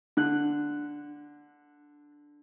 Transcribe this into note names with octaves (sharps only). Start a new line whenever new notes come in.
D3 F#6